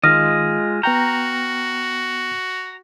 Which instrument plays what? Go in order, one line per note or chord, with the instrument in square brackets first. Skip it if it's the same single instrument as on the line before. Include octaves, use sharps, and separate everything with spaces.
[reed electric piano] D#3 [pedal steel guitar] G#3 F4 D#5 [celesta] F6 A#6
[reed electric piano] B3 G5 G6 [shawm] F#4 [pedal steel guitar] A#5